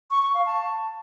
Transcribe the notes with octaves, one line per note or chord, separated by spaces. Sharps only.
C#6
C#6
F5
A5